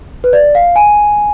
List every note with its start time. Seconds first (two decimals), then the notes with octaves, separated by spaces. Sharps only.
0.24 B4
0.33 D5
0.55 F5
0.76 G#5